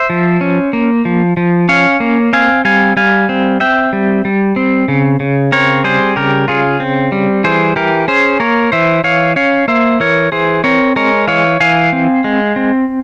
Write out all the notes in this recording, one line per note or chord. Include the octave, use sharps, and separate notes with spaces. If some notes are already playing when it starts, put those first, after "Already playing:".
Already playing: C5 E5
F3
C#4
A#3
F3
F3
C#4 C#5 F5
A#3
C4 F5 G#5
G3 F5 G#5
G3 F5 G#5
C4
C4 E5 G5
G3
G3
C4
C#3
C#3
C4 A#4 C#5
G3 G#4 C5
C#3 G4 A#4
C#3 F4 G#4
C4
G3
E3 G#4 C5
E3 G4 A#4
C#4 G#4 C5
A#3 A#4 C#5
E3 C5 E5
E3 C#5 F5
C#4 C#5 F5
A#3 C5 E5
E3 A#4 C#5
E3 G#4 C5
C4 A#4 C#5
G#3 A#4 C#5
E3 C#5 F5
E3 F5 G#5
C4
G#3
C4